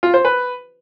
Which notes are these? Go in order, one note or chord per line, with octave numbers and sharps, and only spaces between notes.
F4
C5
B4